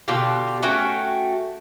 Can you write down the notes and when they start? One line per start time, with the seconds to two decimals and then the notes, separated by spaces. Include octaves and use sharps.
0.08 B2 D3 F4 G4
0.63 A3 C#4 F#4 G5